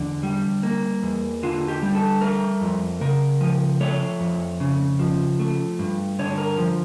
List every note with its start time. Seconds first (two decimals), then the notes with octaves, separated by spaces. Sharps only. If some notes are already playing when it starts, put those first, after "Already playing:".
Already playing: E2 D3
0.23 G3
0.63 A#3
1.03 E2
1.43 D3 F4
1.68 G4
1.82 G3
1.95 A4
2.21 A3 A#4
2.61 F2
3.01 C#3 A#4
3.41 F3
3.80 A3 C#5
4.20 F2
4.60 C#3
4.99 F3
5.39 A3
5.79 G2
6.19 D3 C#5
6.38 A#4
6.58 F3